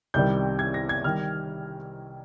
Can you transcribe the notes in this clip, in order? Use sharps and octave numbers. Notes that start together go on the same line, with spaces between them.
C2 C3 D#3 G3 G6
G#6
A#6
G#6
D#3 G3 F6